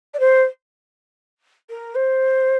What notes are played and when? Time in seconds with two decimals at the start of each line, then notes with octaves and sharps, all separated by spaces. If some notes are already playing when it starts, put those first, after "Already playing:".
0.14 D5
0.20 C5
1.70 A#4
1.95 C5